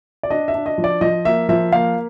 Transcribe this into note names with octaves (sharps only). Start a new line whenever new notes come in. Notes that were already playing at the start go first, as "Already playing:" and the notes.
D5
D4 D#5
E5
D4
D#5
F3
D5
F3 D#5
A#3 E5
F3 E5
A#3 F5